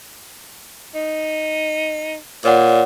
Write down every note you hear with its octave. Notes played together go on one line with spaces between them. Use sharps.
D#4
A#2 C#5 D5 F#5